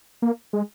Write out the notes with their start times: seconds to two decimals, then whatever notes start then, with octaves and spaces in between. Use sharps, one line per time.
0.22 A#3
0.53 G#3